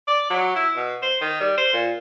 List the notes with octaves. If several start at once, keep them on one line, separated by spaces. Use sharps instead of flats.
D5
F#3
E4
B2
C5
D#3
G3
C5
A#2